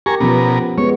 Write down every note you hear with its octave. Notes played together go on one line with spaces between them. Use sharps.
G4 A#4 G#5 A#5 C#6
B2 F3 B3 C#4 A#4
G#3 B3 C#5